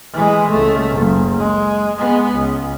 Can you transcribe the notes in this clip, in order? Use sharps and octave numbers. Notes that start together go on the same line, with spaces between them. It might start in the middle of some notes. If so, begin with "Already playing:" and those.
E3 G#3
C#2 A3
F#1
G#3
G#3 B3
C#2